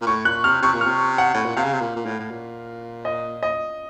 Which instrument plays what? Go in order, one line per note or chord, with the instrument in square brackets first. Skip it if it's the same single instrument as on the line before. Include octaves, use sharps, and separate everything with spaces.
[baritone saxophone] A#2
[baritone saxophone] A2 [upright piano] C#6
[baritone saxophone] A#2 [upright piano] F#6
[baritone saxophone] C3 [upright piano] F6
[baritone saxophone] C3 [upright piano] C#6
[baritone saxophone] A#2
[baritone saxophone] C3 [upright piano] F6
[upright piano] F#5
[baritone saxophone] A2
A#2
[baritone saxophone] C3 [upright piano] F5
[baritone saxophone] C#3
C3
A#2
A#2
A2
A2
A#2
[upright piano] D#5
D#5